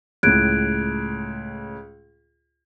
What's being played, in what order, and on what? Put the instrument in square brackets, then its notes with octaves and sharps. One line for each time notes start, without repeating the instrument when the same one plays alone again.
[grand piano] C#2 A2 [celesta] F#6 G#6 D7